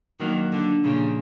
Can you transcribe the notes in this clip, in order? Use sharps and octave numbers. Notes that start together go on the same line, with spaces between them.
D#3 F#3 A#3 D4 F#4
D3
A#2 C#3 F3 A#3 D4 G4